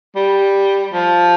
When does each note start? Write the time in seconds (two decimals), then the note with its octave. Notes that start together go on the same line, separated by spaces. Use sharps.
0.16 G3
0.93 F3